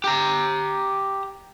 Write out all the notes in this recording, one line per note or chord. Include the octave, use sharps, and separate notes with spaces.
G4 A#5